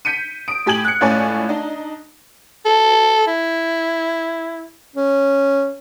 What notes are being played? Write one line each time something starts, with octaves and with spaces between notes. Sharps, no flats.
G6 B6 C#7 D#7
D#6 D7
A2 G4 G#5 G#6 F#7
F#6 C#7
C#2 A2 C#4 D5 G#5
D4 D#4
A4
E4
C#4